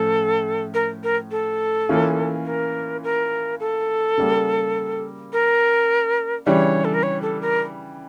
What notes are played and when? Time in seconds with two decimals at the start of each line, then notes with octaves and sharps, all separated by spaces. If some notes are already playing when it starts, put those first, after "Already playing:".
Already playing: A2 F3 C#4 A4
0.74 A#4
1.03 A#4
1.31 A4
1.89 E3 A#3 C#4 F4
2.46 A#4
3.04 A#4
3.60 A4
4.17 C#3 G3 A#3
5.33 A#4
6.46 C#3 E3 G3 D4 C#5
6.85 A4
6.94 A#4
7.03 C#5
7.22 A4
7.41 A#4